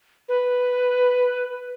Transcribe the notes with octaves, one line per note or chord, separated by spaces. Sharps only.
B4